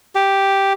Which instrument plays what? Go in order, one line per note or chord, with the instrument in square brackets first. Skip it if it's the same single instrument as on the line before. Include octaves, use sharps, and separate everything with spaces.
[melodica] G4